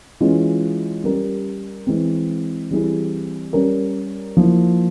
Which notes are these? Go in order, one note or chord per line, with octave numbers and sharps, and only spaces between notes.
E3 G#3 C#4 F4
G3 C#4 G4 A#4
E3 G#3 C4
E3 G3 C4 E4 G#4
G3 C#4 G4 A#4
F3 A#3 E4